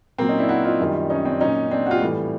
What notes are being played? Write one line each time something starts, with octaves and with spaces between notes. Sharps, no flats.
A#2 F#3 A#3 C4
C#4 D#4
D4 E4
E4 F#4
D#4 F4
F#2 D#3 G3
C#4 D#4
C4 D4
A#2 F#3 C#4 D#4
C4 D4
F#4
F4 G4
A2 E3 G3